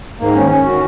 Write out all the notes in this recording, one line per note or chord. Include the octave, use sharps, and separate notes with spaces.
G#2 D#3 A#3
C#4
C#4
D#3 F#4